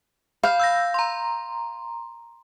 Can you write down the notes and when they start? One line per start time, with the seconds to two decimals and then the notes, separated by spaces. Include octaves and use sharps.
0.43 F5 B5 G6
0.60 E6 G6 A#6
0.94 A#5 C6